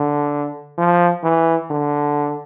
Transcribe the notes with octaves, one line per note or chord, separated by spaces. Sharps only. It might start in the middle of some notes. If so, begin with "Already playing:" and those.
Already playing: D3
F3
E3
D3